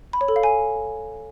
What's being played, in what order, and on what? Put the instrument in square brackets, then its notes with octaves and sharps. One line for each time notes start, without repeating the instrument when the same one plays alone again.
[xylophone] B5
C#5
A4
F5
G#5